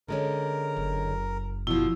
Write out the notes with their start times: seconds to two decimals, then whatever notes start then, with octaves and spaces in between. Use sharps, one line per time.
0.08 D3 G#3 C#4 A#4
0.77 F#1
1.67 B2 F3 E4